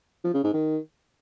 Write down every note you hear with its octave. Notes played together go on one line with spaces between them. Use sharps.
F3
C#3
G#2
D#3